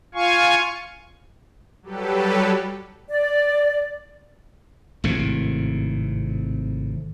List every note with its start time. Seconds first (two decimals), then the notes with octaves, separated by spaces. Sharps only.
0.15 F4 F5 G#5 C#6
1.82 F#3 G3 G4 A4 B4
3.09 D5
5.04 G#1 A2 C3